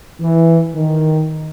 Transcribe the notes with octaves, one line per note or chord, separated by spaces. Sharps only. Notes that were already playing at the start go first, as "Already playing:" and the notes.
E3
D#3